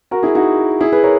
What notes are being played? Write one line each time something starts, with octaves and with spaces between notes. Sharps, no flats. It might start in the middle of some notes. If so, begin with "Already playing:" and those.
F#4 A#4
E4 G#4
D#4 F#4
E4 G#4
G#4 B4
A#4 C#5